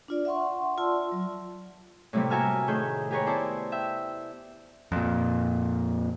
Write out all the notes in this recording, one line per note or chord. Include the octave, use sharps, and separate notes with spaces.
D4 F4 D5
E5 F#5 C6 C#6
F4 D5 A5 C6 E6
F#3
A2 C3 G3 A#3 C4
F#4 A#4 E5 G#5 A5 F6
A2 D#3 A3 G#4 G6
G4 G#4 A#4 B4 C#5
B3 E4 C5 D5 A5
E5 G5
F2 A#2